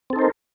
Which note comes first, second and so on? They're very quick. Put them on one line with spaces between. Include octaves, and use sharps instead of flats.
C4 A4 D#4 C5 A#4